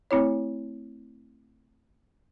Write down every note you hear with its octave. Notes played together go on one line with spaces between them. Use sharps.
A3 C4 E4 C#5